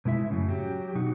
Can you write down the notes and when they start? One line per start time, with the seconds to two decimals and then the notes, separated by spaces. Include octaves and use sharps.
0.05 B2 G#3 E4 E5
0.31 F#2 A2 C#3
0.49 F#3 G4
0.95 B2 D#4 F#4